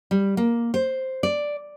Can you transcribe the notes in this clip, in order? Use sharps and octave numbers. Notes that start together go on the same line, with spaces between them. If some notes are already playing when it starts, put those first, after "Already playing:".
G3
A#3
C5
D5